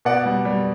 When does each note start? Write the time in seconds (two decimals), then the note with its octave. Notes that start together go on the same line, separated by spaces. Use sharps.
0.05 B2 D5 F#5
0.26 G3
0.45 G3